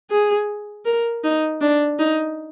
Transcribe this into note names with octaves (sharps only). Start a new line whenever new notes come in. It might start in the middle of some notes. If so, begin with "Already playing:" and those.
G#4
A#4
D#4
D4
D#4